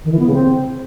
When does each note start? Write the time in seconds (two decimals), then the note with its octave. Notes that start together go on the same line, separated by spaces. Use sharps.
0.05 D#3
0.12 E3
0.19 B3
0.27 C#3
0.34 C4